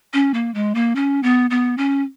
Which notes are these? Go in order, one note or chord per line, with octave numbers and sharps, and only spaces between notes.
C#4
A#3
G#3
A#3
C#4
B3
B3
C#4